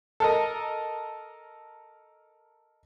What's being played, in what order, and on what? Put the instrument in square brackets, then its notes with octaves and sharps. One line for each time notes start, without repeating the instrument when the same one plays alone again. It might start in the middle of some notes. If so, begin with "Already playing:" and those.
[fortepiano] A4 A#4 D#5